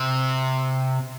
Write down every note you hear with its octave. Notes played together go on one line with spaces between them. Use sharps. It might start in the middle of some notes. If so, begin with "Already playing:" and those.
Already playing: C3